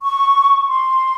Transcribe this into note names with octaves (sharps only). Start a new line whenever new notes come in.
C#6
C6